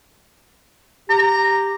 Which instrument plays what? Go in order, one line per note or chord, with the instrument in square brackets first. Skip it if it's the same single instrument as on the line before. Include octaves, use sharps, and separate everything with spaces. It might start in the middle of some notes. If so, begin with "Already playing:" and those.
[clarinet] G4 [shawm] A#5